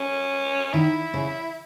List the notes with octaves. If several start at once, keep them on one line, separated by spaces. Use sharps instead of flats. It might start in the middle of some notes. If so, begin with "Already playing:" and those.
Already playing: C#4
D#3 E4
C#3